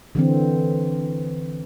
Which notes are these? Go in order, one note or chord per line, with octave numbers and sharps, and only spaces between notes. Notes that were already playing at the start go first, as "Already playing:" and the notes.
D3 E3 C4